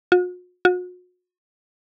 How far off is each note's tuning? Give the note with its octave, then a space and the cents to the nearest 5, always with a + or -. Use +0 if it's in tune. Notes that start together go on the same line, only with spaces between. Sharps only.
F#4 -45
F#4 -40